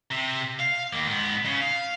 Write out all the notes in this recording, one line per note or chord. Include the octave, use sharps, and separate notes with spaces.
C3
F5
D#3 A#3
G#2 B3
C#3
F5